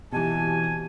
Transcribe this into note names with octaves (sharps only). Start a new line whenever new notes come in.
B2 E3 C4 F#4 G4 G#5 A5